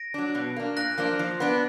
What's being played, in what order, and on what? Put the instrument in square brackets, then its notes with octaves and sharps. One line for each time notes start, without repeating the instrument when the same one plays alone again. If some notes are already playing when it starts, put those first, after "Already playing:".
Already playing: [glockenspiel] A#6 D7
[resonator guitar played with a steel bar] F#3 D4
B2
A#3 D4
[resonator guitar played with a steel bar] A#2 [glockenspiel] F#6 A#6
[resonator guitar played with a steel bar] F3 A#3 D4 [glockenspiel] F#6
[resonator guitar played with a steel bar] F3
B3 D4